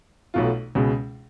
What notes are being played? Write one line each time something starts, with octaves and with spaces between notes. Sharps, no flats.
B1 B2 A3 F4
C#2 B2 G#3